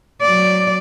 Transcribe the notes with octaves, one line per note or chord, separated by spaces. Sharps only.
F#3 D5